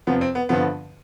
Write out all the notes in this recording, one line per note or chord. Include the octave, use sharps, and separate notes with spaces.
F2 C3 F3 B3
C4
B3
G2 D3 F3 B3